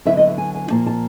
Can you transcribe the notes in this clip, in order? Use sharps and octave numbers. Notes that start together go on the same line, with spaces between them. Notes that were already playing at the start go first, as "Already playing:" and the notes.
D3 F#3 B3 E4 E5
D#5
E5
G#5
G#5
A#2 F3 A#3 A5
A5